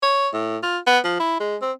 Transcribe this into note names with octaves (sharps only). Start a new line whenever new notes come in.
C#5
A2
F4
B3
F3
E4
G#3
C4